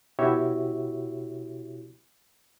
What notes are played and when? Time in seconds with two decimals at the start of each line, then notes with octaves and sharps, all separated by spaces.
0.19 B2 E4 F#4 G4 C#5 E5